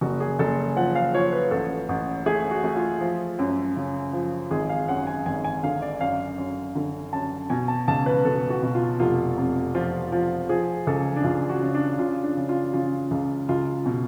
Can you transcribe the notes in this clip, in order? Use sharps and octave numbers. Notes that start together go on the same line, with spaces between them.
F#1 F#4
G#4
F#1 A4
F3 F#5
F5
F3 C#5
B4
A1 A4
A1
A3 G#4
F#4
A3
F4
F3
F#2
C#3
F3
G#1 G#4
F5
F#2 F#5
G#5
G#1 G#5
G#5
D3 F5
D5
F#2 F5
F#2
D3
F#2 A5
B2 G#5
A5
C#2 A5
B4
B2 A4
F#4
B2
F4
F1 F4
F2
F3 F4
F3
F3 G#4
C#2 A4
D4
C#2 F4
F#4
C#3
D4
C#3 F4
D4
C#3
F4
C#3 F4
C#2
C#2 F4
B2